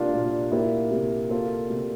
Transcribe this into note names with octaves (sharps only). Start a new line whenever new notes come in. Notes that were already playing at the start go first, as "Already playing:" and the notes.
Already playing: C3 A#3 D4 F4 G4
A#2
A#3 E4 G4
C3
A#3 F4 A4
C3